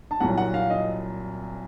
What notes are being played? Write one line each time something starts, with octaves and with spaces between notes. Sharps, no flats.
A5
C2 A#2 F#3 F#5
F#5
F5
D#5